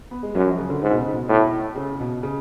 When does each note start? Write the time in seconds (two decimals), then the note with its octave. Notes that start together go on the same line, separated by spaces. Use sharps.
0.11 B3
0.23 G#3
0.35 F#2 F#3
0.46 F3
0.58 C#3
0.70 D3
0.82 G#2
0.91 B2
0.98 C#3
1.13 B2
1.29 A2
1.76 C#3
2.00 B2
2.23 C#3